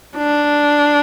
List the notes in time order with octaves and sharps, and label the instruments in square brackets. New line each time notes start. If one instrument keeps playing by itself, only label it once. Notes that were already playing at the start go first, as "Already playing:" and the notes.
[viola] D4